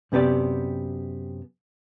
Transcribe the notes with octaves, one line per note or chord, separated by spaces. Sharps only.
F#2 C3 B3 G4 D5